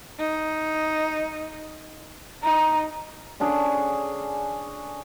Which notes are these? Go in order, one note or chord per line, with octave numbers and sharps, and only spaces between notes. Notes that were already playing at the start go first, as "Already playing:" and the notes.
D#4
D#4 A#5
D3 C#4 D4 G#4